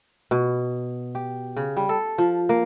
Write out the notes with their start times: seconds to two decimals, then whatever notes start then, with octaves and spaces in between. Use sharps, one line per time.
0.31 B2
1.15 G4
1.56 C#3
1.77 G3
1.89 A4
2.18 F3
2.49 A#3